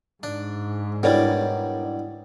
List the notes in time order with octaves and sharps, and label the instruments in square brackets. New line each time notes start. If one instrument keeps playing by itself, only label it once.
[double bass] G#2 [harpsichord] D4
[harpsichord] B2 G3 [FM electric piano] D4 E4 [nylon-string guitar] A#4 C#5 D5